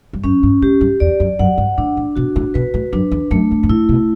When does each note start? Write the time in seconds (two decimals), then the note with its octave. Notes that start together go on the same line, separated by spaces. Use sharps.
0.13 G2
0.24 F#2 C#4
0.43 G2
0.62 A2 G4
0.81 G2
1.00 E2 D5
1.20 F#2
1.39 F#2 F#5
1.58 G2
1.78 A2 D4
1.97 A2
2.16 B2 F#4
2.36 A2
2.54 B2 B4
2.74 A2
2.93 F#2 D4
3.11 E2
3.31 F#2 A3
3.51 G2
3.63 G2
3.69 A2 E4
3.89 B2